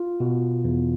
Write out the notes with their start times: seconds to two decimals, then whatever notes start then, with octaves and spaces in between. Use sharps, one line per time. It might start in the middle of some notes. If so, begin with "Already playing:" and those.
Already playing: F4
0.20 B2
0.65 E2